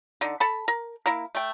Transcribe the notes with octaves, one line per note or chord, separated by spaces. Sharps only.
D3 D#4
A4 A5 B5
A#4
A#3 E4 A#4
A3 G5